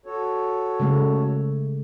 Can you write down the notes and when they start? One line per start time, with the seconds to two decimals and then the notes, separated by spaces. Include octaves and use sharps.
0.06 F#4 A4 C#5
0.80 C#3 G#3 A3